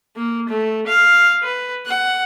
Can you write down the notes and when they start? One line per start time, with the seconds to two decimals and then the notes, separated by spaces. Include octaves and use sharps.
0.16 A#3
0.49 A3
0.87 F5
1.43 B4
1.86 F#5